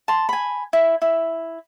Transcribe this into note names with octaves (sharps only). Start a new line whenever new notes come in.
A5 C6
G#5 B5
E4
E4